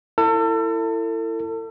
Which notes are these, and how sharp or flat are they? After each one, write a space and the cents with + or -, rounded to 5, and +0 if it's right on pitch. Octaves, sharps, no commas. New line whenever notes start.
E4 +15 A4 +35